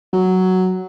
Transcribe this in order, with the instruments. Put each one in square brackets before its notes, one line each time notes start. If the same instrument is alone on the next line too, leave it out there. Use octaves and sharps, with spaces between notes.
[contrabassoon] F#3